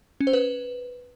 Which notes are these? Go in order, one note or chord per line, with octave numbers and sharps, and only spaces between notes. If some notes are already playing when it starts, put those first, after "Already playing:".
C#4
C5
B4